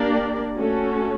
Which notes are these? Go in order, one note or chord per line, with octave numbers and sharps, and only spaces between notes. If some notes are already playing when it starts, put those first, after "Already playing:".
Already playing: A#3 D4 G4 A#4 D5
A3 C#4 F#4 A4